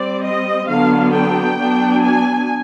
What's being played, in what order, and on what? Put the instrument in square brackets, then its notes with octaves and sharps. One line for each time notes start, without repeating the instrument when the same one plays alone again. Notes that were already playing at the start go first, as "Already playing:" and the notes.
Already playing: [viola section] G3 C4 D5
D#5
D3 F#3 B3 D4 F5
G5
F#3 B3 D4
G#5